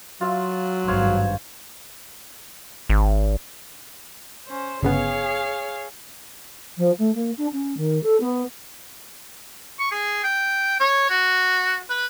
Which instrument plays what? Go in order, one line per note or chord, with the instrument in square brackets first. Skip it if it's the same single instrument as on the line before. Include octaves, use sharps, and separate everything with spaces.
[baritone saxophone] F#3 [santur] F4 E5
[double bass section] G#1 G2 [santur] C5 C#5 F5
[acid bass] G#1
[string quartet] C#4 C5
[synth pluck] G1 C#3 B3 [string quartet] G#4 C#5 F5
[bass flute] F3
A3
A#3
D4
C#4
D#3
A4
B3
[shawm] C#6
G#4
G5
C#5
F#4
B4